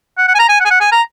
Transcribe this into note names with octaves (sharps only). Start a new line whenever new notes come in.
F#5
F#5
G#5
A#5
G#5
F#5
G#5
F#5
G#5
A#5